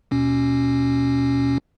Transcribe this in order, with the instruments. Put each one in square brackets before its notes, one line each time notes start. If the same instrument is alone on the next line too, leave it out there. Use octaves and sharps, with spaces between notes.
[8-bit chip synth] D#2 B2 C#4